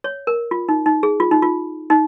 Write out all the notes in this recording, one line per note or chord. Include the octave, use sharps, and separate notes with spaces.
C#5
A#4
F4
D#4
D#4
G#4
F4
D#4
F4
D#4